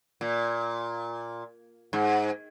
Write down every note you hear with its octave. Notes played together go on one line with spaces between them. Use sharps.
A#2
G#2